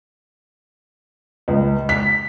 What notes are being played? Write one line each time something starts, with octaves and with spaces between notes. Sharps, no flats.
C#2
B6